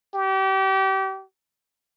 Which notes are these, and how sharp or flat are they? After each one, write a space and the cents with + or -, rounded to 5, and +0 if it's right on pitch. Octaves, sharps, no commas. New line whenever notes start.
G4 -30